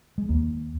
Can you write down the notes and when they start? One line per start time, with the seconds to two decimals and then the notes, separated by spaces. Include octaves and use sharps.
0.18 G#3
0.29 D#2 A#3